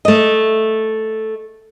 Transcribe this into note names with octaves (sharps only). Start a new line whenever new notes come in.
A3 D#5